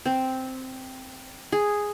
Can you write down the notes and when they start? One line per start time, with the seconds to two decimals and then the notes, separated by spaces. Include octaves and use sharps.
0.06 C4
1.52 G#4